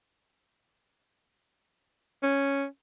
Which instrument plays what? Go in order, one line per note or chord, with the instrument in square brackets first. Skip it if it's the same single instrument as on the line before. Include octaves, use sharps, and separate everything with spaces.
[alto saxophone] C#4